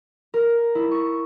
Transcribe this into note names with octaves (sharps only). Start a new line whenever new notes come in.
A#4
E4
C#6